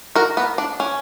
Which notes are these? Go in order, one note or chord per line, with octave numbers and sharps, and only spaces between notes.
F#4 A#4
B3
D4
C#4